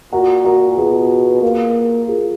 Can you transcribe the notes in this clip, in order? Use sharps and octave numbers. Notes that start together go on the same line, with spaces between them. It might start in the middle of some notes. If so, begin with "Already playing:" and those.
A#2 F#4 A#4
F#4 A#4
B2 F4 G#4
A#3
F4 G#4